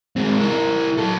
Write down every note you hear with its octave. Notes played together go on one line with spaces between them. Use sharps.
G#3 C4
E4 A#4
F#3 A4